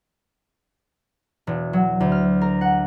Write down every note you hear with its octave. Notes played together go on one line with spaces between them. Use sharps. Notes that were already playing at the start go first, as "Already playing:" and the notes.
E1
F#3
D2
F6
A#4
F#5